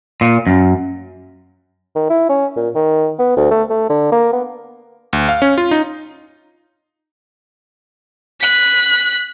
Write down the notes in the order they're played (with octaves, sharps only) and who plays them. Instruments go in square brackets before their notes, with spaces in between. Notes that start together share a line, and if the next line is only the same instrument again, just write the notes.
[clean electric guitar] A#2
F#2
[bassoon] D#3
E4
C#4
A#2
D#3
B3
D2
A3
A3
D3
A#3
B3
[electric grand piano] D2
F5
C#4
F4
D#4
[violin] F#6 B6